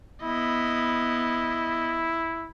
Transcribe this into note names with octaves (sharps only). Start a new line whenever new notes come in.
B3 E4 D#5